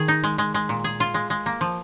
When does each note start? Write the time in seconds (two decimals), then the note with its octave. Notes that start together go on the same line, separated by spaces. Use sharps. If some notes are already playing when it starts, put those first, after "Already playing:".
Already playing: D#3 G#4
0.08 D#4
0.23 G#3
0.38 G#3
0.54 G#3
0.69 A#2
0.84 G#4
1.00 F4
1.14 G#3
1.30 G#3
1.46 A#3
1.61 F3